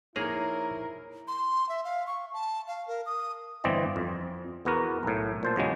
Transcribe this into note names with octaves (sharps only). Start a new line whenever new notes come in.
F2 A#3 D#4 E4 G#4 A#4 C#5 A#5
C6
E5
F5
C#6
A5
F5
A#4
D#6
G1 E3 C4 D5 D#5
F2
E2 B3 F#4 A#4
B1 A2
A#2 C5 A5
E2 C#3 F#3 G#3